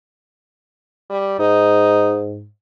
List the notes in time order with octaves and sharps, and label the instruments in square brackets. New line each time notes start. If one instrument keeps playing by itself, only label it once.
[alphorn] G3
[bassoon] G#2 [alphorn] D#4